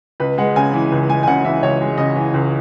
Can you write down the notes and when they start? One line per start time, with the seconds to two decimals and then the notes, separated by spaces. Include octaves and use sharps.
0.20 C#2 B4
0.38 G#3 F#5
0.56 C#3 G#5
0.73 E3
0.92 C#2
1.09 G#3 G#5
1.23 G#5
1.27 C#3 F#5
1.44 E3 E5
1.63 C#2 C#5
1.81 G#3
1.98 C#3 D#5
2.16 E3
2.34 C#2